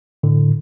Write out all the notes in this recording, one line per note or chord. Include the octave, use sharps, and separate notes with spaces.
A2 D3